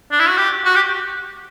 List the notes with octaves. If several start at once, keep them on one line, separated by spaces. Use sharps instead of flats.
D4
E4
F#4
G4
F#4
G4